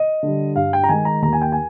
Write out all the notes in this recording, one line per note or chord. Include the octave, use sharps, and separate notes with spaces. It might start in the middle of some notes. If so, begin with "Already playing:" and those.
Already playing: D#5
D3 G3
G2 F5
G5
A#5
D#3 G#3 G#5
A#5
D#2 A#5
G#5
G5
G#5